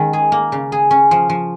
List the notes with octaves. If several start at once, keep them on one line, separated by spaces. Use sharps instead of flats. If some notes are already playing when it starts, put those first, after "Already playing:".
Already playing: D#3 G#3 C#4
G#4
A#3
C#3
G#4
C#4
F3
F3